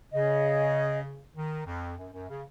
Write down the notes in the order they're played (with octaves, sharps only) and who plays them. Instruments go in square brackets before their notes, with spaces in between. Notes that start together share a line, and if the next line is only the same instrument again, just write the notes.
[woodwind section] C#3 [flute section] C#4 G#4 D#5
[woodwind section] D#3
F2
F#2
F#2
C#3